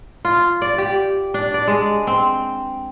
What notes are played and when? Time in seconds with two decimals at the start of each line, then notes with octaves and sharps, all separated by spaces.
0.25 F4
0.62 D5
0.78 G4
1.34 D4
1.54 D5
1.67 G#3
2.07 C4